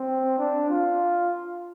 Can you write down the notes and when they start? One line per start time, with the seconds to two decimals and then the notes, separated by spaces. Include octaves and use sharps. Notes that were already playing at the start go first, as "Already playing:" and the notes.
Already playing: C4
0.38 D4
0.70 F4